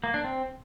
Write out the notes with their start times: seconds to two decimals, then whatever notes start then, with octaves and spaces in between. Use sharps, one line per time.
0.04 A#3
0.14 D4
0.24 C4